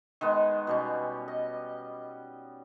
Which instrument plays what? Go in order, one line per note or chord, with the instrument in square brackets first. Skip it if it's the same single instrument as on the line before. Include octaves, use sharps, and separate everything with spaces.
[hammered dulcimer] D#3 G#3 B3
B2 G3 C#4
D#5